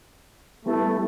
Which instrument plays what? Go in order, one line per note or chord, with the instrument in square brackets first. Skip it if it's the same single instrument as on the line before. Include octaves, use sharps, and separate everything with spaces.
[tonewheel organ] G3 B3 E4 A4 [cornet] A3